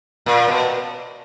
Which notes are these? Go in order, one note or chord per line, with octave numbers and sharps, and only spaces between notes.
A#2
B2